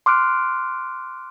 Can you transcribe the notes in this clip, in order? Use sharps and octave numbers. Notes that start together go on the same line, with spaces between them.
C6 D6 F6 F#6 D7